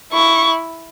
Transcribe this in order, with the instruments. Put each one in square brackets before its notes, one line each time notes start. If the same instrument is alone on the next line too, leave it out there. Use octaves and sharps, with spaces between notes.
[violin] E4 [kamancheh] C#6